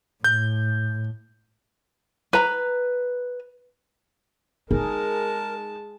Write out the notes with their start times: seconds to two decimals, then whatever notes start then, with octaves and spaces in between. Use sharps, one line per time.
0.24 A2 G6
2.33 B4 A#5
4.71 G#3 D#4 G#4 A#4 A5